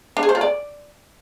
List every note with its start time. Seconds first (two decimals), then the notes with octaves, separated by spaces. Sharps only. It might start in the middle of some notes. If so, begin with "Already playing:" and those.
0.17 D4
0.23 G#4
0.29 C5
0.35 F4
0.41 D5